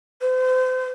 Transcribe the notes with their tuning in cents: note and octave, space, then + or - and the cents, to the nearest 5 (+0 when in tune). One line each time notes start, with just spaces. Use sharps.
C5 -35